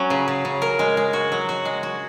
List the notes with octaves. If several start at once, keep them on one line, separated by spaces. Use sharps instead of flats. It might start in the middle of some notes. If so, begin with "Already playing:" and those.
Already playing: F#3 C#4
C#3
C#3
C#3
A#4
G#3
G#3
F#4
F#3
F#4
G#3
F#4